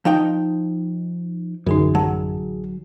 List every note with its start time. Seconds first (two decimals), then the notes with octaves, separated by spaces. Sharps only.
0.05 F3 D#4 F5 G5
1.66 A1 F#2 D3 D#4 G#4
1.95 F#3 A5